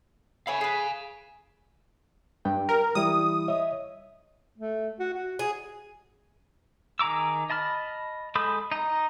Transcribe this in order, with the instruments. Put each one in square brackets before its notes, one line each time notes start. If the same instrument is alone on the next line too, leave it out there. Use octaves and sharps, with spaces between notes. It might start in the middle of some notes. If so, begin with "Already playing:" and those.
[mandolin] C#5 E5 B5 [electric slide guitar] F5 G#5
[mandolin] G#4 B4
[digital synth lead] G2 [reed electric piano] G5
[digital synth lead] A#4
[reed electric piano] E3 G3 E4 [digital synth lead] D#6
[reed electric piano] C#5 D#5 E5
[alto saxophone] A3
F#4
F#4
[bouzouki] G#4
[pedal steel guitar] D#3 G#4 A#5 D6 E6
D#5 A5 B5 F6
G#3 A4 B5 D#6 G6
D#4 A#5